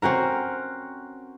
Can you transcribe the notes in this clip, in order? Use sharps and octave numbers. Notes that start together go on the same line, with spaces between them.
C4 C#4 F#4 A#4